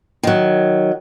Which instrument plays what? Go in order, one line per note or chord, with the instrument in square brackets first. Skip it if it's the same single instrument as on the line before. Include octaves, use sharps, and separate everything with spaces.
[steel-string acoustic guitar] D#3 F#3